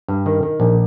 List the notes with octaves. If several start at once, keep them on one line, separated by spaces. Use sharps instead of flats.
G2
D#3
D#3
A#1